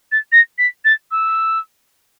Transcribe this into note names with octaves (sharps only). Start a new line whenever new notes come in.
A6
A#6
B6
A6
E6